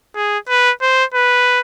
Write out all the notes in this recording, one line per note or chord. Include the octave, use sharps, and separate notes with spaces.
G#4
B4
C5
B4